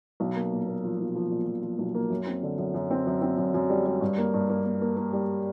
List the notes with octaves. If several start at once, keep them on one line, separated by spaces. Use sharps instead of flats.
B1
A#3
A#2
A#3
F3
B1
F3
A#2
F3
F3
B1
A#3
F#2
C4
D3
F#2
F#2
C4
F#2
C4
F#2
F#2
G3
G3
G2
A#3
G2
A#3
A#3
A#3
A#3
G3